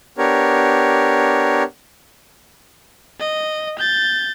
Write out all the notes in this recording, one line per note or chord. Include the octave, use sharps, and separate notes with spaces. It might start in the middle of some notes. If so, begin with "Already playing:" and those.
B3 D4 G4 A#4 C#5
D#5
G6 A6